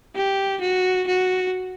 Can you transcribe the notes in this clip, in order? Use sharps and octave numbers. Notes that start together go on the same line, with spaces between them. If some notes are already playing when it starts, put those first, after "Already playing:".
G4
F#4
F#4